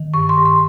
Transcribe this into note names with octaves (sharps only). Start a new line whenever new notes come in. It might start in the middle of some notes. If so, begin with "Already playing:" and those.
Already playing: D#3
G2 C#6
C6
G2
C6